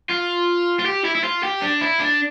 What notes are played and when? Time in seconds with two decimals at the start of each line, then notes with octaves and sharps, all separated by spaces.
0.09 F4
0.80 F4
0.86 G4
1.05 E4
1.15 E4
1.24 F4
1.44 G4
1.62 D4
1.81 E4
2.00 D4